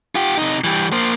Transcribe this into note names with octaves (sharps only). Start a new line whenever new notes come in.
F4 G4
C3 D#4
E3 G3
A#3 C5